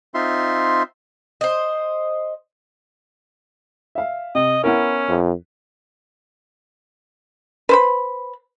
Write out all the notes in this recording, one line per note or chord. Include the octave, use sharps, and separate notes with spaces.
C4 D#4 F4 E5 C6
C5 D#5
E5 F5
C3 D#5
B3 C#4 E4 A#4
F2
B4 C5 B5